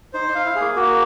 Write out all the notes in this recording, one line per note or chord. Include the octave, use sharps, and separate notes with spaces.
D#4 C5
D#4
F5
E4
A#3 G#4
A#3 F#4